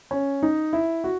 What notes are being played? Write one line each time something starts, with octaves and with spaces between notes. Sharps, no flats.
C#4
D#4
E4
F#4